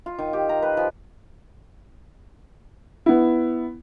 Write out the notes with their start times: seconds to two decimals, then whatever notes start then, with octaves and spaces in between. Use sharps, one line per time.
0.06 F4
0.18 D#3
0.33 G4
0.49 A#5
0.62 B4
0.77 F3
3.06 B3 E4